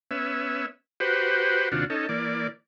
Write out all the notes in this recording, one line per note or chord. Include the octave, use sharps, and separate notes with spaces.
B3 C#4 E5
F#4 G4 B4 C5
D#2 C3 D4 F4 F#4
C#4 D#4 A4
E3 A#3 D5